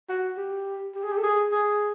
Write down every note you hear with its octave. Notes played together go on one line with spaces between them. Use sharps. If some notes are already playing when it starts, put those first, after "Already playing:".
F#4
G4
G4
G#4
G4
A4
G#4
G#4